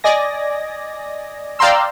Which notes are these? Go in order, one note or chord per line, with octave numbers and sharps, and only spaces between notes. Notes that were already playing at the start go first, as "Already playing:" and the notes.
D5 D#5 G#5 A#6
D5 F5 G5 A#5 C6 E6